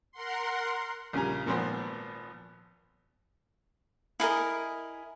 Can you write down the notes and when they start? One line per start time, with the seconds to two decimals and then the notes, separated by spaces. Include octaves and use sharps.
0.12 A#4 F#5 C6
1.13 A#1 C#3 G3 G#5 A#5
1.46 G#1 A#2 F3 B3 C5
4.20 E4 G#4 A#4 D#5